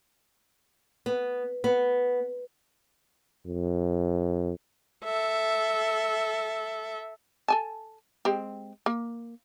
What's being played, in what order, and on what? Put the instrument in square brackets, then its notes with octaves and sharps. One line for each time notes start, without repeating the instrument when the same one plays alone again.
[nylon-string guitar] B3
B3
[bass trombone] F2
[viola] A4 E5
[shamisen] A4 G#5 A5
G#3 C4 G4
A#3